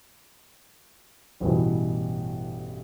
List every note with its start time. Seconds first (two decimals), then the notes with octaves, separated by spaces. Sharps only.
1.40 A1 G2 B2 E3